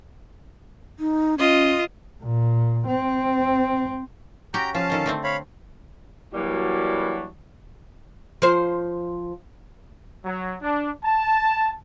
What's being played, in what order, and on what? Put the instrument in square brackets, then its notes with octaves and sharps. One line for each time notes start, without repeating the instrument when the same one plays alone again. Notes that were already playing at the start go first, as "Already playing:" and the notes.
[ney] D#4
[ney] C#4 [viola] F4 D#5
[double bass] A#2
C4
[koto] C#4 F#4 G4 [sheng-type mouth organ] G5 A#5 G6
[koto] F3 [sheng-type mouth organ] C#4 F5 A5
[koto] D3 D#3 A4
D3 A3 C4
[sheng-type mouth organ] C#5 F5 B5
[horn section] E3 F#3 G3 A#3 D4 F#4
[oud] F3 C5
[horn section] F#3
D4
A5